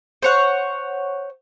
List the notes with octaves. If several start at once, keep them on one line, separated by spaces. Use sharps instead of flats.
C5 C#5 F#5